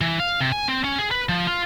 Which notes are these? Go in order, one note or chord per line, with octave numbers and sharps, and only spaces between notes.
E3
F5
C3
G#5
C4
C#4
G#4
B4
F3
F4